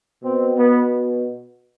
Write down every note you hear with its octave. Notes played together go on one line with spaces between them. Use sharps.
B2 C4
B3